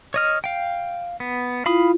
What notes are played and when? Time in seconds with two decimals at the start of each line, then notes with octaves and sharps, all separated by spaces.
0.14 C#5 D#5 F6
0.44 F5 G5
1.20 B3
1.66 E4 F4 F5 B5 D#6